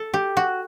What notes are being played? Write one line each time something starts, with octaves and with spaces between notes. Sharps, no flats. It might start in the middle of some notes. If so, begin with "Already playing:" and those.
Already playing: A4
G4
F#4